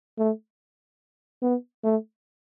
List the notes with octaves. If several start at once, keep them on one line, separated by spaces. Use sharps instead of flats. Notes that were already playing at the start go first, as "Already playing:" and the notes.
A3
B3
A3